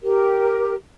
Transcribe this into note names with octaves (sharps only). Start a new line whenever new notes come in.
G4 A#4